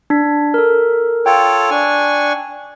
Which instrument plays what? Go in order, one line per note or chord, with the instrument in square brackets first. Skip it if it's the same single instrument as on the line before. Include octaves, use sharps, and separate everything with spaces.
[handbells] D4 B6
A4 A#4
[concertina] F4 A4 C#5 [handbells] G5
[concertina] D4 G#5 C#6